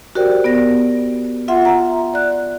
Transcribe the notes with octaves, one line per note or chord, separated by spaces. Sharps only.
F#4 G4 A#4 C5 D5 G5
B3 D5 A#6
F4 E5 F#5 C6
E5 F#5 A#5
D5 F#6